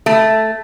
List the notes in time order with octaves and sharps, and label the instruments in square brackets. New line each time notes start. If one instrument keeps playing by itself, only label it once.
[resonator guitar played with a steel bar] A3